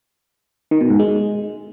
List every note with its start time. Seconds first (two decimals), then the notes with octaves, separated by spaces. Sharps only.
0.71 D#3
0.81 B2
0.90 G#2
0.99 G#3